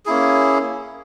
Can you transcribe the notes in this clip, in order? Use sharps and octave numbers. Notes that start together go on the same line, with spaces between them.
A#3 C#4 E4 G#4